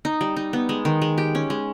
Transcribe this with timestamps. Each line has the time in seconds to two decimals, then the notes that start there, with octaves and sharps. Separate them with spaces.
0.05 D#4
0.21 G3
0.36 D#4
0.53 B3
0.69 G#3
0.85 D#3
1.02 G#3
1.18 G4
1.35 C#4
1.50 G#3